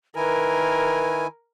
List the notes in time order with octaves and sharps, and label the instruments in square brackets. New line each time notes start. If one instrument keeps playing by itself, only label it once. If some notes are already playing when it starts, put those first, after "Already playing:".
[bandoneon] D#3 E4 G#5 [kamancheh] A#4 [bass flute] B4